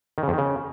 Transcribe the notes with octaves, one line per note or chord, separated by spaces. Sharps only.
D#3
C#3
F2
D#3
C#3